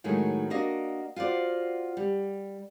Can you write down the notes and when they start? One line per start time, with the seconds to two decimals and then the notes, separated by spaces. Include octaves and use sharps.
0.04 A2 D#3 F#3 G#3 D#4
0.50 A#3 D4 F#4 D#5
1.16 F4 F#4 C5 D5
1.97 G3